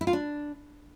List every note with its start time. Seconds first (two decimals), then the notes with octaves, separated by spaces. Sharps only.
0.01 E4
0.07 F4
0.13 D4